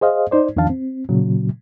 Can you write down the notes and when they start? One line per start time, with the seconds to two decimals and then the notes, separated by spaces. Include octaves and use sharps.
0.01 G#4 C5 D#5 F5
0.31 D#4 C5 D5
0.56 E2 D#3 F3 D4 F5 A5
0.70 C4
1.09 A#2 C#3 F#3